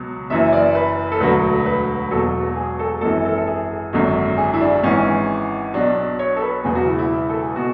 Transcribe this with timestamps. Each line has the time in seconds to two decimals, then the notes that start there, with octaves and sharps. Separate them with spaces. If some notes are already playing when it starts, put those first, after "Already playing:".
Already playing: C#2 B2 F#3
0.30 F#1 F#2 E3 E5
0.53 D5
0.75 B4
1.12 A4
1.20 E1 D2 D3 F#3 B4
1.66 B4
2.11 E1 E2 B2 F#3 A4
2.56 G#4
2.79 A4
3.01 G#1 F#2 E3 A4
3.25 A4
3.38 A4
3.47 G#4
3.93 G#1 F#2 D3 F#3
4.37 G#4
4.54 E4
4.60 D4
4.83 G#1 G#2 E3 C#4
5.74 B1 B2 F#3 D4
6.19 C#5
6.36 A4
6.42 B4
6.64 E1 E2 C#3 F#3 G#4
6.75 F#4
6.87 E4
6.99 E4
7.29 A4
7.42 G#4
7.56 B2 F#4